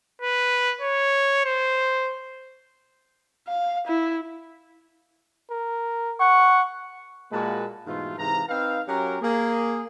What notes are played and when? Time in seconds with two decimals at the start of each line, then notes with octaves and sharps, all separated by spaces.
0.22 B4
0.81 C#5
1.45 C5
3.48 F5
3.87 E4
5.50 A#4
6.20 F#5 C#6
7.32 A#2 G#3 A#3 F#4 B4 A5
7.86 G#2 B2 E3 A3 F4
8.17 G#2 C3 E3 F5 A#5
8.49 C4 D#4 B4 F5
8.88 F#3 C#4 G4 A#4
9.22 A#3 G#4